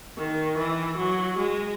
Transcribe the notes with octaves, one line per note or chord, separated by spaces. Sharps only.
D#3
E3
F#3
G#3